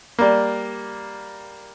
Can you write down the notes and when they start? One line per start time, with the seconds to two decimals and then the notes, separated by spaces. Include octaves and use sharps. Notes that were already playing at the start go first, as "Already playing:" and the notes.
0.19 G3 A#3